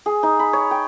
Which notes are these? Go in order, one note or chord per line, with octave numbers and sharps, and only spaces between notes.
G#4
D#4
B5
C#5
G5